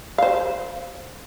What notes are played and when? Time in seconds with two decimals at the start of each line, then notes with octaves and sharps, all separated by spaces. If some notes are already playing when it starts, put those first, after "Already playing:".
0.18 C5 F5